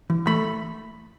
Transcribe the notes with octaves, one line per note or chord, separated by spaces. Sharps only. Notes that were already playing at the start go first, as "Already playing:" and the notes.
E3
A3 B5